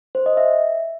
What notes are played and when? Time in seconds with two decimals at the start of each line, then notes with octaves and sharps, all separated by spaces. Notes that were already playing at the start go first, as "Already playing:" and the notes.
0.15 C5
0.26 D#5
0.37 E5